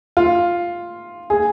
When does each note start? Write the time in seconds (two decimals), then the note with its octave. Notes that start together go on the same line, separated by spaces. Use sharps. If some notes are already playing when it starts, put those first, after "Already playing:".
0.17 F4
1.30 G#4